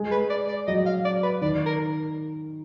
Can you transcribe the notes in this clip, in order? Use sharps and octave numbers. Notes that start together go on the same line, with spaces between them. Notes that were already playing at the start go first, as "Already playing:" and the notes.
Already playing: G#3
B4
D5
D5
F#3 D#5
F5
D5
B4
D#3 D5
A#4